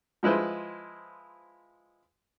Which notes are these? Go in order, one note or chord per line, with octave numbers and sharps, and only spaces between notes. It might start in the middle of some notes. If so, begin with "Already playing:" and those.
F3 G#3 E4 B4 C5